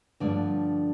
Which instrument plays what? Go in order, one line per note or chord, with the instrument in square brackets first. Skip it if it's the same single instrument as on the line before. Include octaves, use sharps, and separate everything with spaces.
[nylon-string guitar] G2 D3 F3 A3 D5